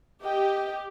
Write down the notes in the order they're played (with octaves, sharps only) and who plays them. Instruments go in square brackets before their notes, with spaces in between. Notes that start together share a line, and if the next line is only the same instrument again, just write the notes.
[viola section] G4 [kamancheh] D#5 G5